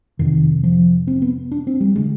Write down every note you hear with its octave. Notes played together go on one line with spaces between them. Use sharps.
F2 C3 D#3
F3
C4
B3
D4
C4
G3
D3 G#3